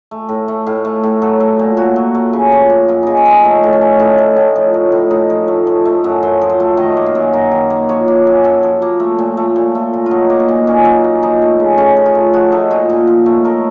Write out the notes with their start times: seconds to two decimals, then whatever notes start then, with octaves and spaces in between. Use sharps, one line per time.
0.11 A3
0.29 A2
0.48 A3
0.67 A2 F5
0.85 A3
1.03 A2
1.22 F#3 A4
1.40 A3
1.59 A#2
1.77 A#2 F#4
1.96 F#3
2.15 A3
2.33 C#3
2.52 F3
2.70 A#3
2.88 F#2 F4
3.03 C#3 D#4
3.17 C#4
3.26 F3
3.31 D#4
3.44 A3 D#4
3.63 A2
3.73 C#4
3.81 A3
3.99 A2 D#4
4.18 A3
4.36 A2
4.56 F3
4.74 A3
4.92 A2
5.11 A2 D#4
5.30 F3
5.48 A3
5.67 F3
5.85 A3
6.04 F#2
6.23 F#2 C5
6.41 F3
6.49 C5
6.60 A3
6.77 D#3 D#5
6.97 A#3
7.06 F5
7.15 F#2
7.33 F#2 A#5
7.51 D#3
7.70 A#3
7.89 F3 C#5
8.08 A#3
8.27 F#2
8.44 F#2 A4
8.63 F3
8.82 A#3
9.00 A3
9.18 A#2
9.37 A3
9.56 A#2
9.75 A3
9.94 A#2
10.06 F4
10.11 F#3 D#4
10.30 A#3
10.40 D#4
10.49 A#2
10.67 A#2 C#4
10.85 F#3
11.04 A#3
11.23 F3 D#4
11.42 A3
11.60 C#3
11.78 C#3 C#4
11.96 F3
12.06 F4
12.15 A3
12.33 F3 F#4
12.52 A3 D#4
12.71 A#2 F4
12.89 A#2 A4
13.07 F3
13.26 A3
13.44 A3 A#4